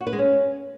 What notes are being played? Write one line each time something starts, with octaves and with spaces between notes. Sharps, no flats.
F#4
B4
G#3
C#4